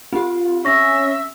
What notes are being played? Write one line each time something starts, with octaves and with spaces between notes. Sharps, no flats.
C4 F4 G4
C#4 E5 C#6 A#6